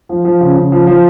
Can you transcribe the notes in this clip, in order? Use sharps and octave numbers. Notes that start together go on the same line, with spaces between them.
F3
F3
C#3
C#3
F3
F3